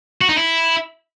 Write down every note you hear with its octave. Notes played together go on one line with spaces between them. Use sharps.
F#4
D#4
E4